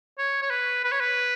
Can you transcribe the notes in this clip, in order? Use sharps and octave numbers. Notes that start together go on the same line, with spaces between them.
C#5
C#5
B4
B4
C#5
B4